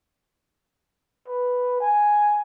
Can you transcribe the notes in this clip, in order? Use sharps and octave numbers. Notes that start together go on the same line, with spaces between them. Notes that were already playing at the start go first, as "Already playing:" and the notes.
B4
G#5